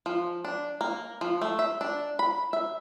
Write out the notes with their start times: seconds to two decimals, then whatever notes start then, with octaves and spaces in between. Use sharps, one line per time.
0.06 F3
0.45 D4
0.81 A#3
1.21 F3
1.42 A3
1.59 E5
1.81 D4
2.19 B5
2.53 E5